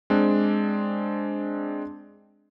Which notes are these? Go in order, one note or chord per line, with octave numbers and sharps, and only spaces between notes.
G#3 C4 D4